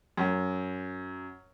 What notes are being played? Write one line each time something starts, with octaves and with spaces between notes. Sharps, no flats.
F#2